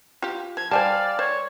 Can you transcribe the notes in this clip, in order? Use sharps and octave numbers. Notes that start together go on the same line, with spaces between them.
F4 G4
F3 G#6
G3 C5 D5 F5 G#5 A5
C5 C#5